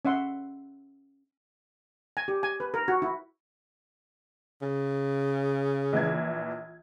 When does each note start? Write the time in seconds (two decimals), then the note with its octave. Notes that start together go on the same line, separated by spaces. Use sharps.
0.05 C#4 E5 F#5 C6
2.17 G#5
2.28 G4
2.43 G#5
2.60 B4
2.74 A#4
2.88 F#4
3.02 E4
4.62 C#3
5.93 A#1 E3 G#6